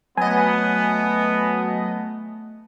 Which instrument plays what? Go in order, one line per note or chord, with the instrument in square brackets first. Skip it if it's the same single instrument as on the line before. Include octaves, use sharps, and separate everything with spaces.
[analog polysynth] F#3 D#5 [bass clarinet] A3 [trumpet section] B3 [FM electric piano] G#5